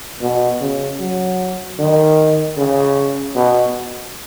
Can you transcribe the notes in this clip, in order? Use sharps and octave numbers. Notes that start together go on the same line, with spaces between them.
B2
C#3
F#3
D#3
C#3
B2